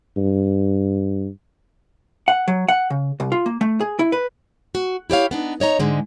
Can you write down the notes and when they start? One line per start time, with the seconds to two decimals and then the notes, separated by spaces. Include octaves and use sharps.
0.17 G2
2.28 F#5
2.48 F#3
2.68 F#5
2.90 C#3
3.20 C2
3.32 F4
3.46 A#3
3.61 A3
3.81 G#4
3.99 E4
4.12 B4
4.75 F#4
5.10 E4 G4 C#5 F5
5.31 B3 D4 D#4
5.60 D#4 C#5 D#5 A#5
5.79 G#2 D3 G#3